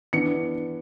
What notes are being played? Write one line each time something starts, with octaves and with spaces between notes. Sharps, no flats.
E3 B3 D4 C#7